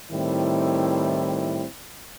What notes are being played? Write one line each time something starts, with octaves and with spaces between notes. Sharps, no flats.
A2 D#3 G3 C4 E4